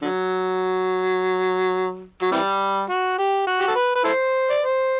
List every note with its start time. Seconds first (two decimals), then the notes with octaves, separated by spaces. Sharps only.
0.01 D3 F#3
2.22 F#3
2.32 C3 E3 G3
2.90 F#4
3.18 G4
3.47 F#4
3.60 G4
3.68 A4
3.75 B4
3.95 B4
4.04 E4 A4 C5
4.50 D5
4.62 C5